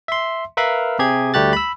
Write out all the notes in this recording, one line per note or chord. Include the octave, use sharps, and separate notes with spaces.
E5 C6
A#4 B4 E5 F5 B5
C3 G4 G#4 G#6
D2 G3 A3 G4 F#6 A6
B5 E6